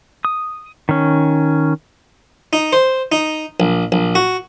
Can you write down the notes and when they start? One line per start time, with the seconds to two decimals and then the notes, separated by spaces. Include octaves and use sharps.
0.25 D#6
0.89 D#3 C#4
2.53 D#4
2.73 C5
3.12 D#4
3.60 A#1
3.92 A#1
4.15 F#4